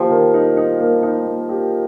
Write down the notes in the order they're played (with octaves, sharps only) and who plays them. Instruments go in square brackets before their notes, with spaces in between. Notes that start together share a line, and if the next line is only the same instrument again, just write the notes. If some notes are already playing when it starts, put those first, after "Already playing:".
Already playing: [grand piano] D#3 A#3 G4 [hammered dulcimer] F3
[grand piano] D#3
D#4
D#4
A#3
D#4
A#3
G4